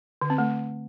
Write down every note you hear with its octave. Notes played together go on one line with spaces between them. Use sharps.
D3
C4
A3